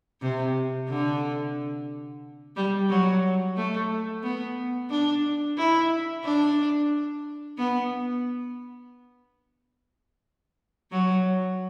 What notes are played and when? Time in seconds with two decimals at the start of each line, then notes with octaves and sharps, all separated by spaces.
0.22 C3
0.89 D3
2.56 G3
2.89 F#3
3.57 A3
4.23 B3
4.90 D4
5.57 E4
6.24 D4
7.58 B3
10.91 F#3